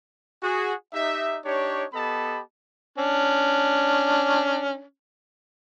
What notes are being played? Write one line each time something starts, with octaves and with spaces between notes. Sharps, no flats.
F#4 G#4
D#4 G4 E5
D4 D#4 G4 C#5
B3 G4 A4 D#5 A5 B5
C#4 D4